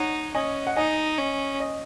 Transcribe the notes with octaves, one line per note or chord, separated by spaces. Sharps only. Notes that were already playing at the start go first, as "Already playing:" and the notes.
Already playing: D#4 C#5 F#5
C#4 D#5 G#5
F#5
D#4 D#5 G#5
C#4
D#5